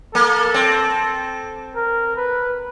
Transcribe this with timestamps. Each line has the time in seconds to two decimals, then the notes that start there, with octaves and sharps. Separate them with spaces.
0.14 A#3 A4
0.54 C4
1.75 A#4
2.16 B4